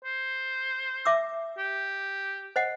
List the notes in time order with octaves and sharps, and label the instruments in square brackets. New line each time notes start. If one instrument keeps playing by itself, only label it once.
[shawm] C5
[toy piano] E5 D6 E6
[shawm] G4
[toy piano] C5 D#5 F#5